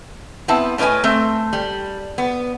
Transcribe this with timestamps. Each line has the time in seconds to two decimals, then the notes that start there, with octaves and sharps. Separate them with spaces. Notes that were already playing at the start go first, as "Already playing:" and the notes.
0.48 B3 C4 E4 A5
0.78 A2 C#4 B4 D#5 G#5
1.04 A3 C4
1.53 G3
2.18 B3